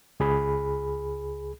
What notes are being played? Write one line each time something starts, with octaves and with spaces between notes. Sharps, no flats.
C#2 G#4 B5